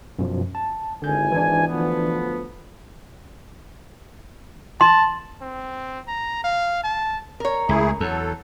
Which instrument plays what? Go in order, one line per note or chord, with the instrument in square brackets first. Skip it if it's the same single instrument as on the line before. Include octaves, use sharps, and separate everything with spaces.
[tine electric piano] F#2 B2 F3
A5
[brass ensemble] G#1 E4 G#5 [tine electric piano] D3 G6
[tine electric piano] E3 D4
[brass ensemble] D2 F3 B3
[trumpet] A5 [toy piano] C6
[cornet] C4
A#5
F5
A5
[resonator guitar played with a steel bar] A#4 C#5
[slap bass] C#2 [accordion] A3 E4 G#4
[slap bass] E2 [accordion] F#3 A4